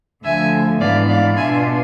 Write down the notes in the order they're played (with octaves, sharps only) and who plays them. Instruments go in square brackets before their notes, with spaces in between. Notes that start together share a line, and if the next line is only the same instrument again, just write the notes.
[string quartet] D2 D3 F3 A3 E5 G#5
G#2 E3 B3 D4 D5 F5
D5 F5
B2 B3 D4 F4 E5 G#5